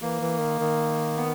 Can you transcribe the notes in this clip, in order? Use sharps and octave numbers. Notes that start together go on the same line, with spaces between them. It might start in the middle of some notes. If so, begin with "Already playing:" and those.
E3 A#3
E3
D#3
D#3
B3